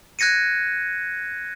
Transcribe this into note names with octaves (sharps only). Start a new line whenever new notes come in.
F#6 G#6 A#6 C#7 D#7